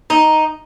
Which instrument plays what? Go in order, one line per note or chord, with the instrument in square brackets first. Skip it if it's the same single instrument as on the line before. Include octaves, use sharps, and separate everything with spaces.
[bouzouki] D#4